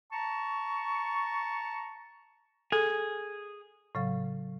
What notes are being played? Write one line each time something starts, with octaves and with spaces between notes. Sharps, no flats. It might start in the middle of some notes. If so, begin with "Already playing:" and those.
A5 A#5 C#6
G#4 A4
A2 C#3 F#3 F5